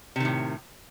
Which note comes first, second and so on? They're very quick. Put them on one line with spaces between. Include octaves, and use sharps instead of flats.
C3 D#3 A2